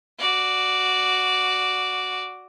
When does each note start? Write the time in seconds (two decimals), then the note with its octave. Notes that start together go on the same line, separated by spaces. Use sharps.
0.19 F#4 D5